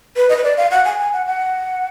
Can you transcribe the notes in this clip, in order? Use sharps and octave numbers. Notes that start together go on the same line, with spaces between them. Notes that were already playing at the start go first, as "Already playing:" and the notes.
B4
D#5
B4
D5
F5
F#5
G#5
G#5
F#5
F#5